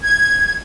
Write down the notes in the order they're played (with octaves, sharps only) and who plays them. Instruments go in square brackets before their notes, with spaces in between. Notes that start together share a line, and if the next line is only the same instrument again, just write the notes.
[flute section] G#6